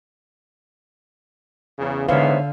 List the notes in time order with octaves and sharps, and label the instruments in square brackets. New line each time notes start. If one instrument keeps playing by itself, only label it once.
[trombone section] E2 C#3
[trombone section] G#2 E3 B3 [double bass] D3 [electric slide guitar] C5 C#5 E5 [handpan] F5